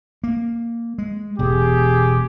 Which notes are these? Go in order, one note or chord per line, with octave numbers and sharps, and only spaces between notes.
A#3
G#3
E1 B2 G4 G#4